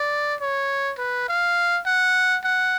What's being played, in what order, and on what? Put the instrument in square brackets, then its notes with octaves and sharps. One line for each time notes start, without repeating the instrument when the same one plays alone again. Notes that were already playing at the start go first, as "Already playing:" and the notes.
Already playing: [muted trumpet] D5
C#5
B4
F5
F#5
F#5